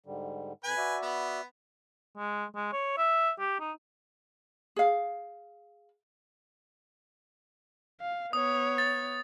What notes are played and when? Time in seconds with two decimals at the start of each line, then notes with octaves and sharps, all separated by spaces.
0.06 G#2 D3 G3
0.64 F2 B4 G#5
0.77 F#4 D5 E5
1.03 B3
2.17 G#3
2.56 G#3
2.73 C#5
2.98 E5
3.40 G4
3.60 D#4
4.76 G#4 F5
8.01 F5
8.33 B3 C#5 D#6
8.78 A6